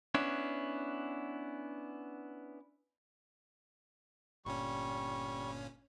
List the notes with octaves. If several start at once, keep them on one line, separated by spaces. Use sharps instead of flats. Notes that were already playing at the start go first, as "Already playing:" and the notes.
B3 C#4 D4 E4
G1 A#2 G3 C#4 C#6